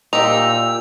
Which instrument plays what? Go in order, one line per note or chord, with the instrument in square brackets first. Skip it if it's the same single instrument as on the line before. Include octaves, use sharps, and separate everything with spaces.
[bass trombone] A#2 [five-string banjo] D#4 G4 [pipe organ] E6 [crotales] F7